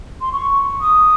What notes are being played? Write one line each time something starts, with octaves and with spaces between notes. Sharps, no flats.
C6
C#6
D#6